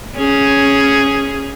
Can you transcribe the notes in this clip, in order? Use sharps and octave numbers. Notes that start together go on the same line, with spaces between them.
C#4 G#4